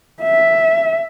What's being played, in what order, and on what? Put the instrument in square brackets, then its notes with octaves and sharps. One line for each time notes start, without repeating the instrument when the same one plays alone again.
[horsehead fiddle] E5